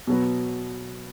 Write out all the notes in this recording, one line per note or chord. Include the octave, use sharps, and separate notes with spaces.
B2 F#3 B3